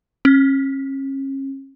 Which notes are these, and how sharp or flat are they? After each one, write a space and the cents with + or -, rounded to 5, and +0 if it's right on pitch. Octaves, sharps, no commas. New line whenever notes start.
C#4 -35